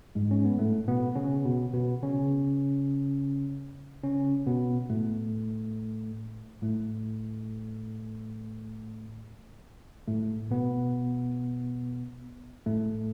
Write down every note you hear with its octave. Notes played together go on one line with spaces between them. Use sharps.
G#2 G#3
C#4
B3
A2 A3
B2 B3
C#3 C#4
B2 B3
B2 B3
C#3 C#4
C#3 C#4
B2 B3
A2 A3
A2 A3
A2 A3
B2 B3
A2 A3